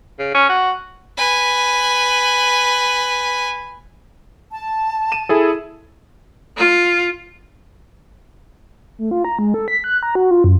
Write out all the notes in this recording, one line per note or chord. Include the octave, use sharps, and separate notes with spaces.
C#3
C#4
F#4
B4 G#5
A5
D#7 E7
E4 G#4 A4
F4
A3
F4
A#5
G#3
A4
B6
F#6
A#5
F#4
F4
F#2